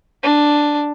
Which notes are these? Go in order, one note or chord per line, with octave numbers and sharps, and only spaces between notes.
D4